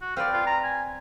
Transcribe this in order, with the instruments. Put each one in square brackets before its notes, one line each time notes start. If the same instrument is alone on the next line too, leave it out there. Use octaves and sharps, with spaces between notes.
[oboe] F#4
[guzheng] C4 B4 D5 [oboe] F5
[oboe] F4
A#5
G#5